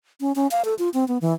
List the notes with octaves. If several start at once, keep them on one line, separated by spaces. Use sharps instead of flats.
C#4
C#4
F5
A4
F4
C4
B3
E3